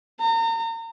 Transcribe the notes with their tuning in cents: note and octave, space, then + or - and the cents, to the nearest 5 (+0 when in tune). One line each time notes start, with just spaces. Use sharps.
A#5 -35